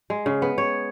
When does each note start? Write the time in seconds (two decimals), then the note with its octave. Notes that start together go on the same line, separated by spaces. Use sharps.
0.10 G#3
0.26 C#3
0.42 B3
0.58 C#5